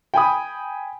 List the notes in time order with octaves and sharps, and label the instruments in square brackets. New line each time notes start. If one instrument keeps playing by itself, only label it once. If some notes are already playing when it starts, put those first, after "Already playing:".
[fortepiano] G5 G#5 B5 D#6